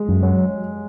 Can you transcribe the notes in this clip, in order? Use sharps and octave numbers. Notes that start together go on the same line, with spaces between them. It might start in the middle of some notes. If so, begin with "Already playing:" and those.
Already playing: G#3
F#2
F#3